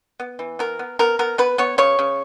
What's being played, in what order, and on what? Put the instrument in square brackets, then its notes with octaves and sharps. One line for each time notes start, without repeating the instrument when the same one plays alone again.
[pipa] B3
E3
B3 A#4
B3
B3 A#4
B3 A#4
B3 B4
B3 C#5
C#3 C#5
C#3